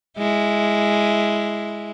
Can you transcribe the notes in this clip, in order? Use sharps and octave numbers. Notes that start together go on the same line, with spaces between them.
G#3 E4